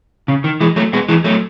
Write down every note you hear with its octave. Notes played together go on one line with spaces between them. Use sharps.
C#3
D#3
E3 G#3
F#3 A3
G#3 B3
E3 G#3
F#3 A3